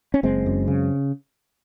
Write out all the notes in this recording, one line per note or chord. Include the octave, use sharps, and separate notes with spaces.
C#4
F#1 G#3 C4
F#2
C#3